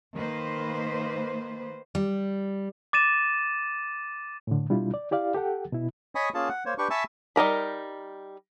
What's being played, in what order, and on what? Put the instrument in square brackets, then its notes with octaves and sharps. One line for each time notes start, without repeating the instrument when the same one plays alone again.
[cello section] D#3 A#3 B4 C5
[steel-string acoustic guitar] G3
[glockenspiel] D6 A6 D#7 E7
[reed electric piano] A2 D3
B2 G3 D4 E4 F4
D5
E4 G4 D5 F5
G4 A4 F#5 G5
B2 E4
[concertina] C#5 D#5 G#5 B5 C#6 D#6
A#3 C#4 F4 G#4 A5
F#5
A#3 C5 C#5
D4 G4 B4 C#6
E5 G#5 A5 B5 C#6 E6
[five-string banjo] G3 D#4 A#4 B5